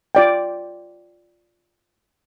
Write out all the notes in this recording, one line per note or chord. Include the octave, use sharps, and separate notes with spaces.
F4 D5 G5